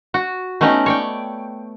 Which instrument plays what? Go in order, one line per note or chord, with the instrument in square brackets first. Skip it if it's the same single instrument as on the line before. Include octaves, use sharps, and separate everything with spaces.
[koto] F#4
A3 B3 C#4 D#4 G5
C#5 D5 G5